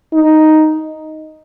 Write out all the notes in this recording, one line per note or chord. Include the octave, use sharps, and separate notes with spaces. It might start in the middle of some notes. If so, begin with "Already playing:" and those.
D#4